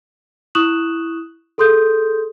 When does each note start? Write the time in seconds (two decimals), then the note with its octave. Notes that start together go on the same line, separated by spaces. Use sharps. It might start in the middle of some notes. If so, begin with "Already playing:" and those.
0.55 E4 C#6 D#6 F#6 E7 F#7
1.58 G#4 A4 C6 D#6 G6